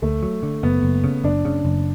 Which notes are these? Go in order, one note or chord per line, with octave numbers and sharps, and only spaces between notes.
D2 A3
F#3
D3
F#1 B3
F#1
C#3
F#1 D4
C#3
F#1